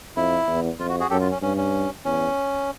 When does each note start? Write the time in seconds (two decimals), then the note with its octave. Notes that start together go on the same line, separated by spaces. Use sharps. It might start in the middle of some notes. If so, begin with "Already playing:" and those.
0.16 F2 E4
0.47 E2
0.79 F2 F4
0.89 F#4
1.00 F#4 G#4
1.10 F#2 G4 A4
1.21 F4
1.31 C#4
1.41 G2 C#4
1.57 C#4
2.05 E2 C#4